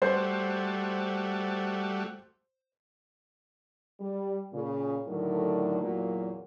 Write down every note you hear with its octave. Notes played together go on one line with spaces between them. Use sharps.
G3 A3 F#4 C5
G3
A#2 C#3
A2 D3 D#3 F#3 A3 A#4
E2 A#2 F#3 A#3 F#4